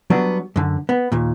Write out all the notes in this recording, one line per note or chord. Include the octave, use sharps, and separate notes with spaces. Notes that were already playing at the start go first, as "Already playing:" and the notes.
F#3 G3 B3 D4
F#2 D3
B3
D#2 A#2